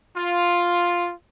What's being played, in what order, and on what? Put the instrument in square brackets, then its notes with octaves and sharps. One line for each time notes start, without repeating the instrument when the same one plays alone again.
[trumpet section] F4